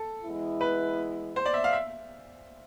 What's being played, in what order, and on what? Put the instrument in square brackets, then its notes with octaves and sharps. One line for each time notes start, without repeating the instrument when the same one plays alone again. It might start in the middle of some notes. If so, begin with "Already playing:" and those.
Already playing: [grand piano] A4
[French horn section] E3 G#3 B3 E4
[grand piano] B4
C5
D5
E5
F5
E5